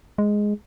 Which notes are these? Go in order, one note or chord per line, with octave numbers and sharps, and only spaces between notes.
G#3